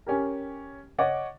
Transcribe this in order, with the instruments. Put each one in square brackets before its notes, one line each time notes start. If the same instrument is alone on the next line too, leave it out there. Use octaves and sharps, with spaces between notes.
[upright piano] C#4 G4 A#4
C#5 D#5 F#5 C#6 D6 A6